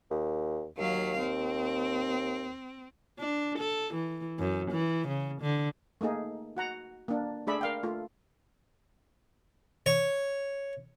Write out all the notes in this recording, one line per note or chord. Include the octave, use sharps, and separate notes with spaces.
D#2
D#2 F#3 F5
C4
D4
A4
E3
F#2
E3
C#3
D3
A3 A#3 D#4 G#4
F#4 F#5 A#5
A#3 D4
A3 D4 G#4 D5 E5 B5
A#4 F5 G5
A3 F4
C#5